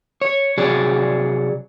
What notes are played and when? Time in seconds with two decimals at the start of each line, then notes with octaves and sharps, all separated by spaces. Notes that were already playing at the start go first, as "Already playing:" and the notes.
0.22 C#5
0.57 C3 F#3 G#4 D5